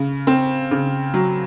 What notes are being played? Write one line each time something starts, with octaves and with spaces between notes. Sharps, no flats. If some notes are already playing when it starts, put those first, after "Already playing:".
Already playing: C#3
C4
C#3
F#3